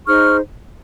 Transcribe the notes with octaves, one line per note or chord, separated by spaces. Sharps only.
D#4 G#4 C5 C#6 F6